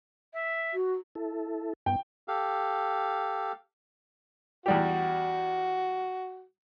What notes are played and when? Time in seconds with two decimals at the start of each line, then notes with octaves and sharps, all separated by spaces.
0.34 E5
0.74 F#4
1.15 E4 A4
1.86 G2 B3 G5
2.28 G4 A4 F5
4.66 E2 G3 F#4 G4